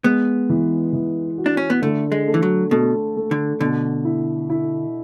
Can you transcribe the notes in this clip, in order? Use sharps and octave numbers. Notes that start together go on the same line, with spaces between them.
G#3 B3
E3
E3
F#4
D4
C#4
B3
D3 A3
G#3
A3
E3
F#3
B2 A3
A3
D3
B2 D3
E4
E4